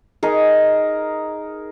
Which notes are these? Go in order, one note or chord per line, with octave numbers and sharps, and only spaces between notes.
D#4 G#4 A#4